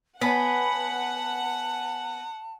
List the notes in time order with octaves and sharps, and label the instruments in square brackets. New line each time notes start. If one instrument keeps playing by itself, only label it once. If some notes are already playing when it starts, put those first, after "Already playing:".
[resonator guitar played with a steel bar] B3 B4 [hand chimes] C#5 G#5 B6 [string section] F#5 [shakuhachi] A5